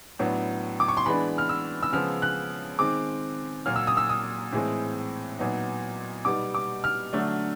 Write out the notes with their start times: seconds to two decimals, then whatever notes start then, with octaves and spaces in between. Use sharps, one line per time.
0.19 A2 F#3 B3 D4
0.80 D6
0.88 C#6
0.97 C6
1.06 E3 G#3 B3 D4 B5
1.38 F6
1.49 E6
1.83 E6
1.92 C#3 F3 G#3 B3 F6
2.22 F#6
2.79 D#3 G#3 C4 D6
3.66 A#2 F#3 A#3 F6
3.76 E6
3.87 D#6
3.97 E6
4.09 D#6
4.53 A2 E3 G#3 C4
5.39 A#2 F#3 B3 D#4
6.25 B2 G3 B3 D#4 D6
6.54 D6
6.84 F6
7.13 D3 F#3 A3 D4